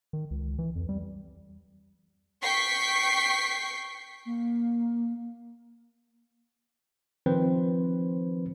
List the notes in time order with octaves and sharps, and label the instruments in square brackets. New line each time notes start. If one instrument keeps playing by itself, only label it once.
[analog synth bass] D#3
C#2
E3
F2
G3
[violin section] G5 C#6 B6 C7
[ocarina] A#3
[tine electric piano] D#3 F3 C4 B4 C5